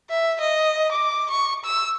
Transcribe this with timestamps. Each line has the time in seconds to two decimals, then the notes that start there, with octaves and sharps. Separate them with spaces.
0.10 E5
0.41 D#5
0.92 D6
1.31 C#6
1.65 E6